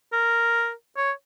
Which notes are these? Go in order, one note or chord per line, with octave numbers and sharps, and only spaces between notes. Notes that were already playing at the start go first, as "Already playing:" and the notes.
A#4
C#5